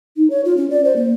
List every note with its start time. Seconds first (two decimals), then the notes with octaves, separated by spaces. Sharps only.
0.17 D#4
0.30 C#5
0.45 F4
0.57 C#4
0.70 D5
0.85 C5
0.96 A#3